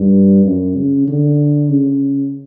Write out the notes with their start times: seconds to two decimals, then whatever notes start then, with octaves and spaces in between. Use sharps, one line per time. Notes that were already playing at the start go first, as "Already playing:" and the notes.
Already playing: G2
0.46 F#2
0.76 C#3
1.08 D3
1.69 C#3